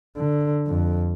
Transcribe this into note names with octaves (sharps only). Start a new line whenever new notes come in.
D3
F2